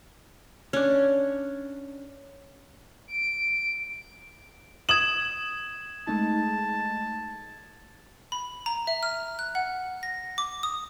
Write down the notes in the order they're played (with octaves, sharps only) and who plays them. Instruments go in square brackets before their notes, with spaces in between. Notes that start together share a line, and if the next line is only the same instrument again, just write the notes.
[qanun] C#4 D4
[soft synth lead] D7
[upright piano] D#6 F#7 [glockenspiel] G#6 E7
[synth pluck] G#3 A3 D#4 [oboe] A5
[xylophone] B5
A#5
E5
F6
F#6
F#5
A#6
D6
D#6